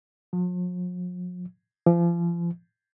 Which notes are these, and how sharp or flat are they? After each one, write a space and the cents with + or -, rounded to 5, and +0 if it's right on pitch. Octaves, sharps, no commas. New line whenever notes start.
F3 +45
F3 -35